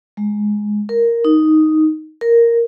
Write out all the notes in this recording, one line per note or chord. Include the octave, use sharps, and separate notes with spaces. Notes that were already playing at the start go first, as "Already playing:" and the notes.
G#3
A#4
D#4
A#4